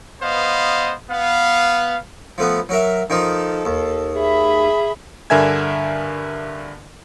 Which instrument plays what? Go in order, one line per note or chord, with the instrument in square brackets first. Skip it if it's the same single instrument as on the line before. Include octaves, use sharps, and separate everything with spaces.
[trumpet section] B3 B4 C5 D#5 F5
B3 F5
[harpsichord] F3 A3 B3
F#3 A#4 E5
[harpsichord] D#3 F3 D#4 [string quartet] A4
[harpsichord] D#2
[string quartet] G#4 E5 B5
[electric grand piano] G2 D3 A#4 E5 G#5 G#6